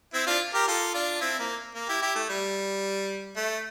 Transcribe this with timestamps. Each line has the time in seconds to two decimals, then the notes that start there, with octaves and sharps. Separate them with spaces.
0.14 C4 E4
0.27 D4 F4
0.54 G4 A#4
0.68 F4 A4
0.94 D4 F4
1.21 C4 E4
1.39 A#3
1.75 A#3
1.88 E4 G4
2.02 E4 G4
2.16 A3
2.29 G3
3.36 A3